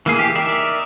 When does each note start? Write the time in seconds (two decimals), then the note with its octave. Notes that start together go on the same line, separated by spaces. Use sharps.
0.06 E3 A#3 G#4
0.19 G4
0.35 D#4 A#4 D5 E5